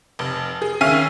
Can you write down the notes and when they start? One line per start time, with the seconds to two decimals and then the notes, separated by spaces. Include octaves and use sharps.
0.19 F1
0.62 G#4
0.81 D#2 C#4 E5 F5 G#5 D#7